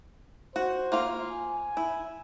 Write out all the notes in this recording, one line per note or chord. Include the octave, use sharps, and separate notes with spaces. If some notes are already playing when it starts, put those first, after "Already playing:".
F#4 C5
A#3 F4 F5
G#5
E4